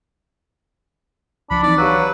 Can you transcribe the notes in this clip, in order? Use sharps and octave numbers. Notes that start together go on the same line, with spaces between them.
C#2 F3 D4 B5 C#7
E3 C4 D#4 D5
F#3 G4 B4 F5 F#6